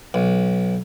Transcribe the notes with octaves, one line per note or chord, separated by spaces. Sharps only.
B1